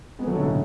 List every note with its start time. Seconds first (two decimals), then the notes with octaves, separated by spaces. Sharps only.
0.19 G#3 B3
0.27 F#3 A3
0.35 B2 D3
0.43 A2 C#3